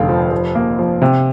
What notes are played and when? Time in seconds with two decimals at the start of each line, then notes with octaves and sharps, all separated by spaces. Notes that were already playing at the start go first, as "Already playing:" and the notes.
Already playing: F1 D3 F5 G5
0.09 F3
0.31 F3
0.55 A#3
0.79 F3
1.02 C3